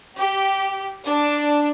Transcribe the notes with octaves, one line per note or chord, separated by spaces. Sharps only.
G4
D4